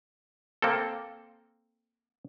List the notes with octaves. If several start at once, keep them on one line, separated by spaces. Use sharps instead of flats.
A#3 C4 A4